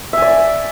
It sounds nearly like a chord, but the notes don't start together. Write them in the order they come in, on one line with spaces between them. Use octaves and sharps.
E5 G#5 D5